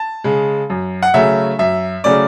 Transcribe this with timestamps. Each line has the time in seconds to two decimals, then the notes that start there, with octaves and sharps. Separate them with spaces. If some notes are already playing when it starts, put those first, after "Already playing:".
Already playing: A5
0.24 C#3 G#3
0.70 F#2
1.03 F#5
1.14 C#3 F#3 A3 C#4 E5
1.59 F#2 E5
2.04 C#3 F#3 A3 C#4 D5